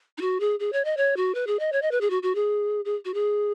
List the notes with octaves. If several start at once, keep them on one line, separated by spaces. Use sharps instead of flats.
D#4
F#4
G#4
G#4
C#5
D#5
C#5
F#4
B4
G#4
D#5
C#5
D#5
B4
G#4
F#4
F#4
G#4
G#4
F#4
G#4